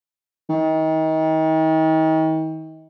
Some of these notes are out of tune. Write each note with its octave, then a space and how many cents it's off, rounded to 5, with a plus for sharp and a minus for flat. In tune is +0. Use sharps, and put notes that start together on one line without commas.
D#3 +35